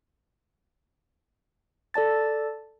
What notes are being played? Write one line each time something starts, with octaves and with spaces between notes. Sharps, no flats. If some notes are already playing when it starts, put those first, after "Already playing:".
A4 D5 A5 A6